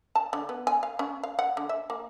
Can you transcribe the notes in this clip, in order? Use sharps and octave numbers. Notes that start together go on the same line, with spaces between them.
A5
D3
B3
G#5
F5
C#4
F5
F#5
D3
E5
A#3